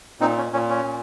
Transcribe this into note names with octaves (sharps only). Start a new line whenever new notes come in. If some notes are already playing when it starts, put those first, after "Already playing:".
A#2 C4 D#4
C#4
A#2 C#4
C#4
A#2